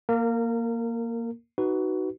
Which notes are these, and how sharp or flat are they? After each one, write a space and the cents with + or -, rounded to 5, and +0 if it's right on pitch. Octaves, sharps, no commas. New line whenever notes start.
A#3 +0 A#4 -25
D#4 +0 F#4 +20 B4 +0